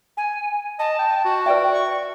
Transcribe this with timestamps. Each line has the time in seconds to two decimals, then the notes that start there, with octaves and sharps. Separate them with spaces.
0.17 G#5
0.79 D#5 A5
0.99 G5
1.25 F#4
1.46 B4 D5 E5 G5
1.72 C#6